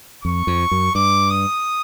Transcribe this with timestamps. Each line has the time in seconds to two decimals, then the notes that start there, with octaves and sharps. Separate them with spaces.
0.24 F2 C#6
0.47 F2
0.71 F#2
0.95 G2 D6
1.30 D#6